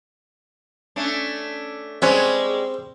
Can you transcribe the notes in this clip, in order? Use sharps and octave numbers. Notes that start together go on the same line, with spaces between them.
A3 C#4 D4
G3 G#3 C4 C#4 B4 C#5